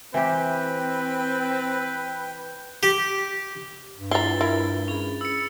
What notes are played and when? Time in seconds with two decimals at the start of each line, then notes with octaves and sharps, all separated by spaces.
0.14 E3 C4 G4 B4 G5
2.83 G4
3.97 G2
4.11 G#3 E4 F4 B4 A#5 A6 G7
4.41 E4 A#4 F5
4.88 C#4 G#4 B5
5.21 E6 C#7